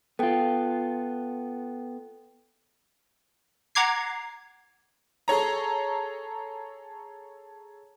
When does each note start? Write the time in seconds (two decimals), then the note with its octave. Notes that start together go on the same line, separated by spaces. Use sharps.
0.19 B3 F4 A4 G5
3.75 F#5 A#5 D6 G#6 C7
5.28 G#4 A4 C#5 A#5